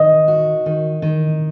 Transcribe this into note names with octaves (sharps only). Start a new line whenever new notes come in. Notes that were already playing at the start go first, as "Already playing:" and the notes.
Already playing: D#3 D#5
F#4
D#3
D#3